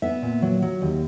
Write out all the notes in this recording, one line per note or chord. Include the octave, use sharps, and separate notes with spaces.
B3 E5
A#2
F#3
F#3
D#2